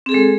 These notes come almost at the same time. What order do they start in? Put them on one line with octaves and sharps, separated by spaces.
C4 G#4 A4 G#3